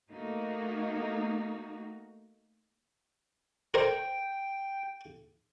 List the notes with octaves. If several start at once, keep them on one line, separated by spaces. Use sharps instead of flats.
A3 A#3 D#4 F#4
A#4 C5 G5